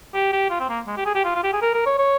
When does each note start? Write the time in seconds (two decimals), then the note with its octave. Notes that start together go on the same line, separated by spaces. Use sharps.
0.14 G4
0.33 G4
0.50 F4
0.60 C4
0.69 A#3
0.87 G#3
0.97 G4
1.06 G#4
1.15 G4
1.25 F4
1.35 F4
1.43 G4
1.53 G#4
1.62 A#4
1.74 A#4
1.86 C#5
1.98 C#5